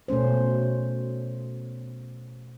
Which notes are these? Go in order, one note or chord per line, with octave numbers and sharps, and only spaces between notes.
B2 A3 C#4 C5